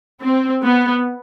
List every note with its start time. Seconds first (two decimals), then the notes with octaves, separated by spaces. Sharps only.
0.23 C4
0.63 B3